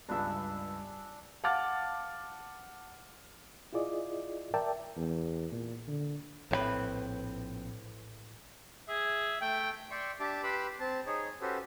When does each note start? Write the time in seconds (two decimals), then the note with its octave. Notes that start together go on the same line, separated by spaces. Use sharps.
0.09 C#2 G2 D4 G#4 E5
1.44 F5 F#5 A5 D6 F6 A6
3.73 E4 F4 G#4 D5 D#5
4.54 A#4 D5 E5 G5 A5
4.96 E2
5.52 A#2
5.88 D3
6.51 A#1 A2 E3 C4 B4
8.89 G#4 E5
9.41 A3 G5
9.90 D5 E5 G5 C6 C#6
10.20 D4 G4 E5 A5 D6
10.43 G4 B4 B5 C6 D6 E6
10.80 C4 A5
11.06 D#4 G#4 C#5
11.41 C#4 F#4 G4 A4 B4 C5